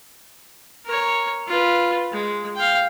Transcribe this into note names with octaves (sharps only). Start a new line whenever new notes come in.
A#4 C#5
F4 B4
G#3
F5 G5